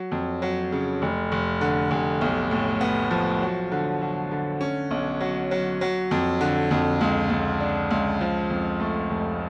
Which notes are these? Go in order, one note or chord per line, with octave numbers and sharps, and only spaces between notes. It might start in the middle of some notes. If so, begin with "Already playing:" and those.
Already playing: F#3
F2
F#3
C#3
F1
F1
D3
F1
B1
A2
B3
F3
F#3
D3
F#3
D3
C#4
B1
F#3
F#3
F#3
F2
D3
F2
C#2
C#2
D4
C#2
F3
F2
A3
F1